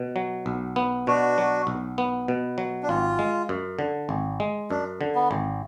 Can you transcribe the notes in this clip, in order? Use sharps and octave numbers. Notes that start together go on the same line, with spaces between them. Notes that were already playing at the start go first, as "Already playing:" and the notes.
Already playing: B2
F#3
B1
B3
B2 D4 F#4
F#3
B1
B3
B2
F#3
D4
G#1 F4
G#3
F#2
D3
G#1
G#3
F#2 D4
D3
B3
G#1